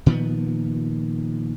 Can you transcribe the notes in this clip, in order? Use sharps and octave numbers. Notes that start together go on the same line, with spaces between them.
A#2 D#3 F3 B3